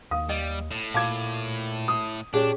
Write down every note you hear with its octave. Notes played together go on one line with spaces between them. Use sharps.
D#2 F5 D#6
G3 D#5
A2
A#2 F5 A5 D6 G#6
D#6
A#2 C#4 D4 G4 G#4